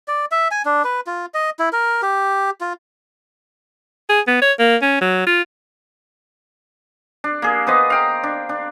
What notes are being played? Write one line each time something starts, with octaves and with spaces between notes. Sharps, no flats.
D5
E5
G#5
D4
B4
F4
D#5
E4
A#4
G4
F4
G#4
B3
C#5
A#3
C#4
F#3
F4
D4
A#3 G#4
B3 B4 C5 D#5
F5 G5 A#5
D4
D4